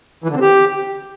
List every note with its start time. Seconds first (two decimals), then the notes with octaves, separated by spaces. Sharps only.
0.24 E3
0.30 D3
0.35 C4
0.41 G4